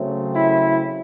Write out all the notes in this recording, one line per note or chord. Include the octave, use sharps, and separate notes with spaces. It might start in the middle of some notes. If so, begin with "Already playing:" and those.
Already playing: C#3 F#3 A3 C4
E4